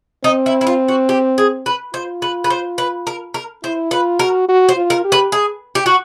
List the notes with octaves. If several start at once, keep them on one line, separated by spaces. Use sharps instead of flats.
C4 D#4
E4
E4
F4
F#4
G4
G#4
B4
F4 C5
B4
B4
C5
B4
A#4
A#4
E4 C5
F4 B4
F#4 A#4
F#4
C5
F4
A#4
G4
B4
G#4
G4
F#4